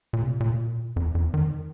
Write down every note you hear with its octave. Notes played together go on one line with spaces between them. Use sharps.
A#2
C3
A#2
F2
F2
D#3